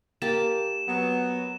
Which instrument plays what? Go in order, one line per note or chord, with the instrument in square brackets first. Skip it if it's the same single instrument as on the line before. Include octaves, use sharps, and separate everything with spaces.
[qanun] A#3 G4 A5 [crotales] E7
[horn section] F#3 B3